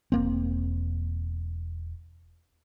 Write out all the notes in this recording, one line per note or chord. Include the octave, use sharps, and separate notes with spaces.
E1 A#3 C4